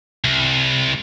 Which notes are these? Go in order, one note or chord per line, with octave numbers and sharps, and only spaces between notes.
C2